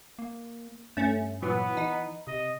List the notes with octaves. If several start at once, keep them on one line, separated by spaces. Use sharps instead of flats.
A#3
G2 A3 C#4
A#2 E3 F#3 B3
E3 D#4
C3 D#5